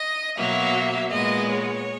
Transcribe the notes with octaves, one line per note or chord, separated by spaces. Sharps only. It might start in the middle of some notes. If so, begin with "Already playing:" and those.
Already playing: D#5
B2 F#3 A#3 E5
A#2 G#3 B3 D#5
C#5